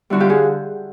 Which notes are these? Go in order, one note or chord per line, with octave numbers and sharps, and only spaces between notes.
F#2 D3 G3 E4 F#4
F4 G4
F#4 G#4